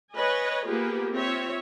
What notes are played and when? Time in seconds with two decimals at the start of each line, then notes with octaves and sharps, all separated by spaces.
0.13 B4 C#5 D#5 G#5
0.65 A#3 B3 F4 G4 G#4 B4
1.10 C4 F4 C#5 E5